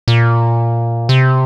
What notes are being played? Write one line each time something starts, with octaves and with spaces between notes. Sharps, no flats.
A#2
C3